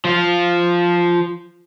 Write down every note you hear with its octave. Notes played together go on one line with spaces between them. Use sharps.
F3 F4